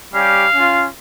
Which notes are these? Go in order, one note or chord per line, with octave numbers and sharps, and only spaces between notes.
G3 C#4 G4 F5
C#4 F4